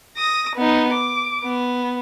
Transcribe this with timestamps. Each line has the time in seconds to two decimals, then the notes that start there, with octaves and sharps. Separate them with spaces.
0.17 D#6 A#6
0.56 B3 D#4
0.93 D6
1.44 B3